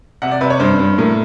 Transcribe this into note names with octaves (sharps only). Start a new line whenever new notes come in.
C3 F#5
D5
C3 B4
C#5
G2 C5
G2
A2 A#4